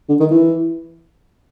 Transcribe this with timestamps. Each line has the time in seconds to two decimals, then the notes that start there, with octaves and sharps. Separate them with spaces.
0.09 D3
0.20 D#3
0.31 E3